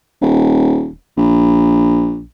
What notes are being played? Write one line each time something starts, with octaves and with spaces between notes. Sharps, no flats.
D#1
A#1